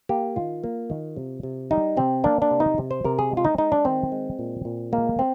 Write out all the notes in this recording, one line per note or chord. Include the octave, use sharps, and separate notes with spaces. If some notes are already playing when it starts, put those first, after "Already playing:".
A#3 G4
D#3 F4
A#3
D#3
C3
C3
G3 D#4
C3 C4
A#3 D4
D4
C3
D#4
C3
C5
C3 A#4
G#4
G#3
F4
D#4
G#3 D#4
D4
D#3 C4
G#3
A#2
A#2
G#3 A#3
C4